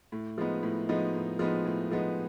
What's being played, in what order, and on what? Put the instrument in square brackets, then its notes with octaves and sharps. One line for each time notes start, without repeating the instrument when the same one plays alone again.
[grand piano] A2
F3 G#3 B3 D#4
A2
F3 G#3 B3 D#4
A2
F3 G#3 B3 D#4
A2
F3 G#3 B3 D#4